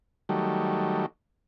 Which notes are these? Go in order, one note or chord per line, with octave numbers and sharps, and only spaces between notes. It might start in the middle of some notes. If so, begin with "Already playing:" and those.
D#3 F#3 G3 A3